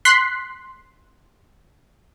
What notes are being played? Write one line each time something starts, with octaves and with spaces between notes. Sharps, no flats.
C6 F#6 B6 C7